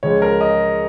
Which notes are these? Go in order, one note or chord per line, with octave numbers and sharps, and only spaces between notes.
C#2 C#3 F3 G#3 C#5
A#4
D#5